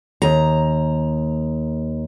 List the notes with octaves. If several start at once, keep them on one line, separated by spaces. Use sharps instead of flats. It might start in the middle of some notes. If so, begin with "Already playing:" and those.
D#2 A#5